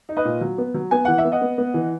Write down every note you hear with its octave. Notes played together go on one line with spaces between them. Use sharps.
D#4
B4 D#5
A#2
F#3
B3
F#3
B3 G#5
E3 F#5
E5
B3
D#5 F#5
B3
B3
E3